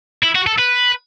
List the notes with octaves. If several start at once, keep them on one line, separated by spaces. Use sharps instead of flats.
E4
F#4
A4
B4